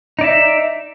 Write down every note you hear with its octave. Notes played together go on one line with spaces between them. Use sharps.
D#4 D5 E5